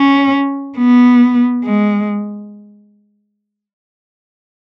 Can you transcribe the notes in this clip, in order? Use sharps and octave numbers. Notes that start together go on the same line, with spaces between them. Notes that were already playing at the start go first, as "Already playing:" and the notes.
Already playing: C#4
B3
G#3